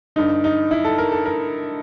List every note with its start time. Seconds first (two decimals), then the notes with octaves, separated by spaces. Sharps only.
0.16 G2 D3 D#4
0.44 D#4
0.71 E4
0.84 A4
0.98 A#4
1.12 A4
1.26 A#4